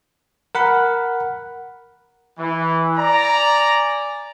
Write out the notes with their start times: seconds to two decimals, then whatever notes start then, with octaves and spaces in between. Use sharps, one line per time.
0.55 A#4 F#5 B5
2.38 E3
2.97 D5 G#5 A#5